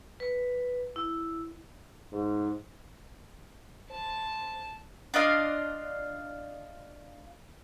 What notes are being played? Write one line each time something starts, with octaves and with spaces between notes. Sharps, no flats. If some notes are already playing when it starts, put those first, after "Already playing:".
B4
E4
G#2
C5 A5
D4 F4 D#5 F5